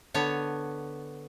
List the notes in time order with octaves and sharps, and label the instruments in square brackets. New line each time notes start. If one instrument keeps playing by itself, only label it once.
[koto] D3 B3 C#5